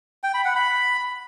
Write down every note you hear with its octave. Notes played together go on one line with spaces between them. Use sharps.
G5
B5
F#5
B5